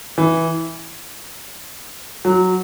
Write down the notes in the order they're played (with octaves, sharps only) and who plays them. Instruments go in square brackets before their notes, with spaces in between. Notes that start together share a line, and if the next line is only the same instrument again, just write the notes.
[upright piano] E3
F#3